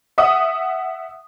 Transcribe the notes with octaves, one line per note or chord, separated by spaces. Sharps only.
E5 F#5 D#6